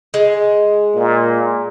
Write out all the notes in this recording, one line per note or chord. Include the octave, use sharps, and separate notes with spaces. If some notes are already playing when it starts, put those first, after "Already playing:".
G#3
A#2